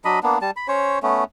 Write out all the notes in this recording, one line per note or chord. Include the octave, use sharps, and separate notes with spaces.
F#3 D4 D#5 B5
A#3 B3 D4
G3 A5
B5
C#4 C5 C#5
A3 B3 C#4